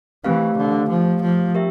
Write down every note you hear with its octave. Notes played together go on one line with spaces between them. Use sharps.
E3 A3 C4 G4 A#4 F5
D3
F3
F3
G4 A#4 E5